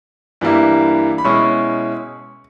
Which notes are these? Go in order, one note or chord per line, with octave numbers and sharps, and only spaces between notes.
G2 E3 G3 A#3 E4
B5
B2 G#3 C#4 E4 C#6